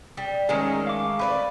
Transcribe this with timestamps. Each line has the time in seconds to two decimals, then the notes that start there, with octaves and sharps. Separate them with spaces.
0.17 G3
0.49 D#3 G#3 A3 C#4 D#4 G#4
0.87 F5 D6
1.19 B4 C#5 D5